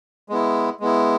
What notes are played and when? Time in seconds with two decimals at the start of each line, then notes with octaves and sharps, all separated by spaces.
0.29 G#3 B3 E4
0.80 G#3 B3 E4